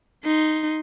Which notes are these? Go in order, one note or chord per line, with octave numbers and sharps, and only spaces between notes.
D#4 C6